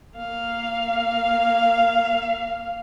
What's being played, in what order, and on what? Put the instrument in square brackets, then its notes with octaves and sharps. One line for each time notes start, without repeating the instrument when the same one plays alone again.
[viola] A#3 F5